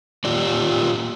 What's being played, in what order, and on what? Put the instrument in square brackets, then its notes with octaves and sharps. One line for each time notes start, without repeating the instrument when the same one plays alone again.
[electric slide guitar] A#2 F4 G4 D5